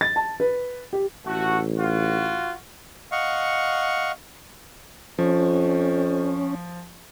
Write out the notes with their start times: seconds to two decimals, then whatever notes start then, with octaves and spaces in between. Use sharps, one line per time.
0.01 A6
0.16 A5
0.40 B4
0.93 G4
1.26 A1 A3 F#4
1.77 F4 F#4
3.12 D#5 F5 F#5 C#6
5.19 F2 F3 C#4